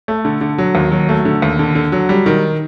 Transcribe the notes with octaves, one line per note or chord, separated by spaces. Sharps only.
A3
D3
D3
F#3
D#2
F#3
A3
D3
D#2
D3
D3
F#3
G3
D#3